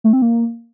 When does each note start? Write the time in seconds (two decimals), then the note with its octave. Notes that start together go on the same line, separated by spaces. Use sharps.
0.04 A3
0.13 C4
0.22 A#3